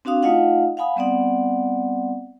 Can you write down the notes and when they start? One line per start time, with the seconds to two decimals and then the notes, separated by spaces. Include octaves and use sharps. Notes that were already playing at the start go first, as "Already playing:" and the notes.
0.05 C4 D4 F#4 F5 D#6
0.23 A3 D#4 F4 D#5 F5 F#5
0.77 F5 F#5 G#5 B5 D#6
0.96 G3 B3 C4 D5 F#5